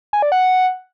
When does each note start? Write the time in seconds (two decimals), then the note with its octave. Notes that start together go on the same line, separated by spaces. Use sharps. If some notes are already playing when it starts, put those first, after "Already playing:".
0.13 G#5
0.22 D5
0.32 F#5